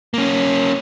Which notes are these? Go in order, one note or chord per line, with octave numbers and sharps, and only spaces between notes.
A#3 C#4